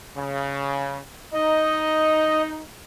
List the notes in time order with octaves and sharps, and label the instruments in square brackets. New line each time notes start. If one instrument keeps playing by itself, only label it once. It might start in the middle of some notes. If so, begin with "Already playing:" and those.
[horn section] C#3
[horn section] D#4 [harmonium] D#5